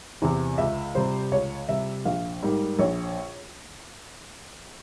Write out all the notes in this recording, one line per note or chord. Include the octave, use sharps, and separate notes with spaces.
E2 C3
C#2 E5
C3 G3 C5
C#2 C#5
C3 G3 E5
A#1 F5
G#2 G3 A#3
A#1 C#5